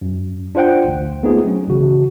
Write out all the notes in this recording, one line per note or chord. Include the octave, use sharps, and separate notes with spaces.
F#2
D4 F4 C5 F#5 G5
A1 D2
A3 B3 C4 D#4 F4 G#4
F#3 C#4
A1 C#3 E3 F#4